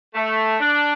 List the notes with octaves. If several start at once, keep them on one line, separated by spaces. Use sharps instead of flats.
A3
D4